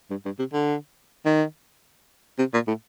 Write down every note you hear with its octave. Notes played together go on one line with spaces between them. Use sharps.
G2
G2
C3
D3
D#3
C3
A#2
A2